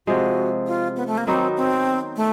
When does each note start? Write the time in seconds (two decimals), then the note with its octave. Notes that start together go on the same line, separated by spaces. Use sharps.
0.07 C3 F3 G#3 F#4
0.67 F4
0.96 B3
1.07 A3
1.17 A#3
1.27 D#3 F#3 B3 C4 D#4
1.57 C4
2.17 A3